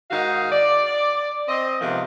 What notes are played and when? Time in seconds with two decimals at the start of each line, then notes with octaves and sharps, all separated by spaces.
0.11 G#2 D#3 D#4 F#4 F5
0.52 D5
1.48 C4 D#5
1.81 G#2 C3 D#3 F3 B3